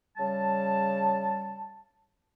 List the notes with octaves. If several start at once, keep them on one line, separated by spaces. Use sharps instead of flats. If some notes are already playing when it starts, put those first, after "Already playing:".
C#3 G3 A5